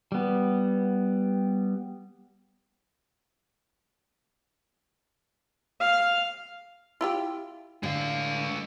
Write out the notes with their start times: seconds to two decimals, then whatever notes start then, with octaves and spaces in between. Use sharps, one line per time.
0.12 G3 B3
5.80 F5
7.01 E4 F4 G4
7.83 A2 D3 G#3 F5